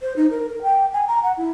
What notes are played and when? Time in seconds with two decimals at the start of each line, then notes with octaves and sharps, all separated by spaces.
0.01 C5
0.16 D#4
0.31 A#4
0.50 A#4
0.62 G5
0.93 G#5
1.08 A#5
1.23 F#5
1.37 E4